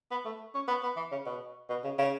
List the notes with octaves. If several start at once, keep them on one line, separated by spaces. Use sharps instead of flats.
B3
A3
C#4
B3
B3
E3
C#3
B2
B2
C#3
C#3